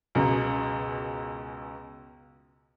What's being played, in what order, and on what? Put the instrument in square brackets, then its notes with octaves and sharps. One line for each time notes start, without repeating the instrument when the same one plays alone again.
[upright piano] C#2 F#2 B2